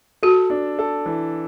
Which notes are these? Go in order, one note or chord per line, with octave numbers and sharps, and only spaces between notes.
F#4 A4
D4
A4
E3